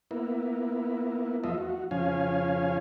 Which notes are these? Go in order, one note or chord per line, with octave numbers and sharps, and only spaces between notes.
A#3 B3 E4
E2 F3 A3 F4 D#5 E5
F#4
F2 C#3 F3 C#4 F5 G#5